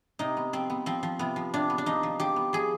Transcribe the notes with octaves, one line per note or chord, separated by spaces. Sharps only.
C3 D#4
B3
F3 C4
B3
F3 C4
F3
C3 B3
F3
C3 D4
B3
D4
F3 D#4
F3
F3 G4
B3
F3 G#4